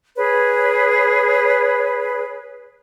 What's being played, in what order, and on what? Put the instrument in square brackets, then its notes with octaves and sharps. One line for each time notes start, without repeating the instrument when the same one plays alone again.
[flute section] G#4 B4 C#5